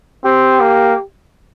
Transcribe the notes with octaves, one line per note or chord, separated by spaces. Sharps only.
C4 G4
A#3